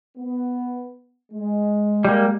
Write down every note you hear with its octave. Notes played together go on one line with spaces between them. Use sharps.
B3
G#3
G3 A#3